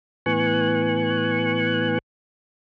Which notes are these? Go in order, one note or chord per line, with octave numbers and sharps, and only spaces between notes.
A2 E3 B3 G#5 C#6 F#6